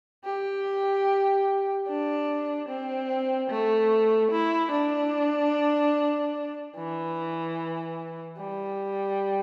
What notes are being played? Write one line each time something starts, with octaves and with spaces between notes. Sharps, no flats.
G4
D4
C4
A3
E4
D4
E3
G3